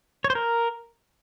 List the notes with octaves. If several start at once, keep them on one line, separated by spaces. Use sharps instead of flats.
C#5
C5
A#4